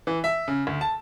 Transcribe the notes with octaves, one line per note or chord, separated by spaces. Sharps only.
E3
E5
C#3
D2
A5